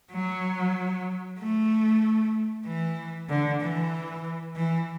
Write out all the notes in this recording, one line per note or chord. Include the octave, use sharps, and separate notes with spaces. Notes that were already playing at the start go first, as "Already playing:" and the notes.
F#3
A3
E3
D3
E3
E3